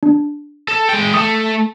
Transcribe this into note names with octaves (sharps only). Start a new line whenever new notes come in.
D4
A4
G#3 G5
A3 A4 D#6